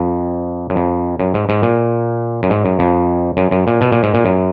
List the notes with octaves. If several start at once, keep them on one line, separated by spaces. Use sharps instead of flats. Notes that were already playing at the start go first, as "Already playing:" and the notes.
Already playing: F2
F#2
F2
F#2
G#2
G#2
A#2
F#2
G#2
F#2
F2
F#2
F#2
A#2
B2
A#2
G#2
A#2
F#2